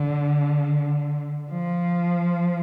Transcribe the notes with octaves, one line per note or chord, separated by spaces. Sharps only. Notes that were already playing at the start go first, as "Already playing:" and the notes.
Already playing: D3
F3